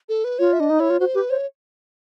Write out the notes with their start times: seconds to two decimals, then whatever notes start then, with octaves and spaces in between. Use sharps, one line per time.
0.09 A4
0.24 B4
0.39 F4 C#5
0.53 E5
0.60 D4 D#5
0.70 D#4
0.80 E4 C#5
0.90 F4
1.00 F#4 C5
1.14 G4 B4
1.30 C5 C#5